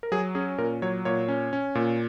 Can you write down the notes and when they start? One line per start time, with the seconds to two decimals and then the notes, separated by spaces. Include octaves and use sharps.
0.03 A#4
0.12 F#3 G#4
0.35 C#4 G#4
0.58 A#2 A#4
0.82 F#3 C#5
1.05 A#2 C#5
1.28 C#4
1.53 C#4
1.75 A#2